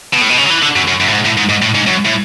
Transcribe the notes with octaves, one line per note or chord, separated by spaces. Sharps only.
B2
A2
B2
C#3
F#3
E3
D3
F#2
F#2
F#2
A2
G#2
A2
G#2
G#2
A2
G#2
F#2
A2